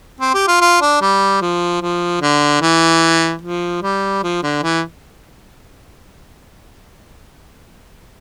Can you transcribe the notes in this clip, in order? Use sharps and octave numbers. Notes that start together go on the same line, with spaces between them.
C4
G4
F4
F4
D4
G3
F3
F3
D3
E3
F3
G3
F3
D3
E3